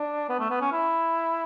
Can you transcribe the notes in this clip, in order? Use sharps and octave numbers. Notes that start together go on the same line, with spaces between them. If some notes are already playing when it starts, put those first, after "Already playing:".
Already playing: D4
B3
A3
B3
C#4
E4